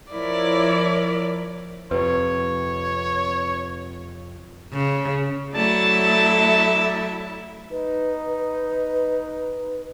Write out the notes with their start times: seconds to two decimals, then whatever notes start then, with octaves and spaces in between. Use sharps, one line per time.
0.12 F3 E4 A#4 C#5 D5
1.91 F2 C3 B4 C#5
4.72 C#3
5.53 F#3 A3 E4 D5 E5 A5
7.71 D#4 B4